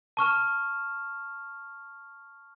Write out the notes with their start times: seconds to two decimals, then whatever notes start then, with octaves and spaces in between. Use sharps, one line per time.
0.17 A5 C#6 F6 E7